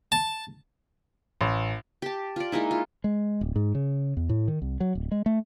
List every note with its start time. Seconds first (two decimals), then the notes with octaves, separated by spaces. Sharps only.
0.12 A5
1.41 A1
2.02 G4 A5
2.36 F4 D5
2.52 G#3 A#3 D#4 E4
2.71 F4
3.04 G#3
3.41 D1
3.56 G#2
3.75 C#3
4.17 E2
4.29 A2
4.48 D#3
4.62 C2
4.80 F#3
4.95 D1
5.12 G#3
5.26 A3